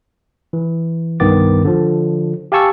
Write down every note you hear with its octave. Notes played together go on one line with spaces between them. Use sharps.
E3
C2 G2 D#3 B3 D6 A6
D3 F3
G4 F5 G#5 A5 C#6 E6